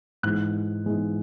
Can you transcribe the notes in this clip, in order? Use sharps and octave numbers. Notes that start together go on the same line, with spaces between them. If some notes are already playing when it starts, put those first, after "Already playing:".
G#2 E3 G#3 F#6
G#2 E3 G#3